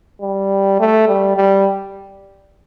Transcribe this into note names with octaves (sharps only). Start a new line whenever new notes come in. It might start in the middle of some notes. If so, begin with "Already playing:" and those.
G3
A3
G3
G3